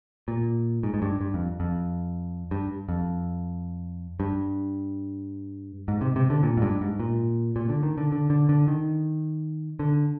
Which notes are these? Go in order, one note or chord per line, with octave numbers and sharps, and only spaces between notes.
A#2
G#2
G#2
G2
G2
F2
F2
G2
F2
G2
G#2
C3
C3
D3
A#2
G#2
G2
G#2
A#2
A#2
D3
D#3
D3
D3
D3
D3
D#3
D3